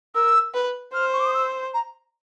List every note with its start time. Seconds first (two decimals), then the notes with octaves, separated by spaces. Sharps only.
0.15 A#4 E6
0.54 B4
0.94 C5 F6
1.13 C#6
1.20 D6
1.26 D#6
1.34 E6
1.74 A#5